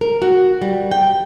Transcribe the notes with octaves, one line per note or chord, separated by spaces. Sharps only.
A#4
F#4
G3
G5